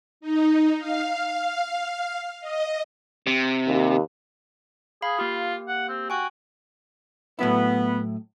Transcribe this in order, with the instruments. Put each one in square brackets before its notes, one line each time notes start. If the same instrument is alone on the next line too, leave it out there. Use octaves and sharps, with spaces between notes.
[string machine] D#4
F5
D#5
[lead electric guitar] C3
[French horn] D#2
[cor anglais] G#4 [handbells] F5 B5
[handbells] A#3 G4 [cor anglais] F4
[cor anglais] F#5
C4
[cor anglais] F#4 [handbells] G5 G#5 C#6
[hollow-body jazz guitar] A2 F#3 E4 [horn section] B3